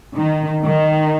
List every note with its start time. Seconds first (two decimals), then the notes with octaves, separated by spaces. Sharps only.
0.15 D#3
0.63 D#3